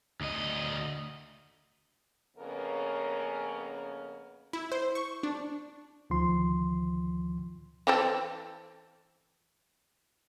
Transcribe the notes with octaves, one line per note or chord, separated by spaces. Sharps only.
D2 D#5
F2 C#3 A#3 B3 C#4 A#4
E4
C5
C#6
D4
D2 D#3 F3 C6
E3 C4 A4